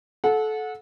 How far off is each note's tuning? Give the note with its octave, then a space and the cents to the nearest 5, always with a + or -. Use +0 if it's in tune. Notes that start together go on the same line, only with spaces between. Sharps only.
A4 -25 F#5 -25